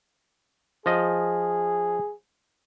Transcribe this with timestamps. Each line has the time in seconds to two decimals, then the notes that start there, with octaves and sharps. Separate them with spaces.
0.86 F3 G#4 D#5